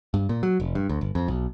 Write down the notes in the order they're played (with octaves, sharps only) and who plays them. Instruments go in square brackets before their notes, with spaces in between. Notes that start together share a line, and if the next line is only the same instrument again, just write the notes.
[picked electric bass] G2
A#2
F#3
F1
G2
D2
G1
F2
B1